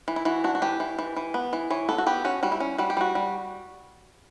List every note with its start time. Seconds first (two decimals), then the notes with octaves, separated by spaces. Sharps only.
0.08 E3
0.16 E4
0.25 E3 F#4
0.44 D4 F#4
0.55 F#4
0.62 E3 G4
0.80 E3
0.99 E3
1.16 E3
1.34 B3
1.53 E3
1.70 E3 C#5
1.89 B3 A4
1.98 F#4
2.07 B3 G4
2.25 C#4 F#4
2.43 G3 F#4
2.52 E4
2.60 C#4
2.78 G3 F#4
2.90 G4
2.97 G3 F#4
3.15 G3